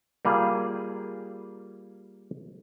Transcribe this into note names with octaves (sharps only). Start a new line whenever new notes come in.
G3 A#3 F4 G#4